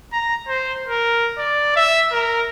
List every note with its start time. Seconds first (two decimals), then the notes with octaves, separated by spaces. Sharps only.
0.13 A#5
0.48 C5
0.87 A#4
1.38 D5
1.76 E5
2.12 A#4